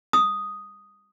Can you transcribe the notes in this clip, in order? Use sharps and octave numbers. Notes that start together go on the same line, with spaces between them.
D#6